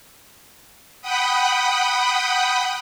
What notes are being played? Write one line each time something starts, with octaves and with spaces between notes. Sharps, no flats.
F#5 G5 B5 D#6